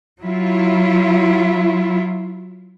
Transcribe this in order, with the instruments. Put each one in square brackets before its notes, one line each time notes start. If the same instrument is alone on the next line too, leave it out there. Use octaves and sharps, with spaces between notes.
[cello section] F#3 E4 F4